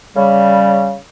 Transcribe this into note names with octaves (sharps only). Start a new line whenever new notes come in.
C#3 G3